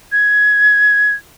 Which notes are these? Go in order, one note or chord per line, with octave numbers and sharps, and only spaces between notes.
G#6